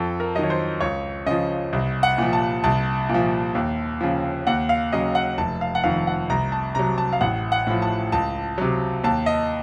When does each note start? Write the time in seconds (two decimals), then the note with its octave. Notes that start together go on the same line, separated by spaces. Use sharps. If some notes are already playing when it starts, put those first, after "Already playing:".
Already playing: F2 A4
0.20 A#4
0.35 F#3 D#5
0.38 D#3 C#5
0.50 C5
0.81 C#2 C#5
1.26 C#3 F3 D#5
1.73 C2
2.03 F#5
2.18 A#2 F3
2.33 A5
2.64 C2 A5
3.09 A#2 F3
3.55 D#2
4.01 C#3 F3
4.47 D#2 F#5
4.69 F5
4.92 C#3 F#3 D#5
5.15 F#5
5.38 F1 A5
5.61 F5
5.75 F#5
5.84 F2 D#3 F5
6.07 F#5
6.30 C2 A#5
6.52 A5
6.75 C3 F#3 A#5
6.98 A5
7.13 F5
7.21 A1 F#5
7.52 F#5
7.67 A2 F3
7.82 A5
8.12 C#2 A5
8.58 C3 F#3
9.04 D#2 A5
9.26 D#5